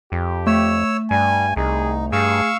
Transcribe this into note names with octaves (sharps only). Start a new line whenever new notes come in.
F2 G4
A3 C#5 E6
G2 G3 G#5
C2 D#4 G#4
G2 G#4 F5 C#6 E6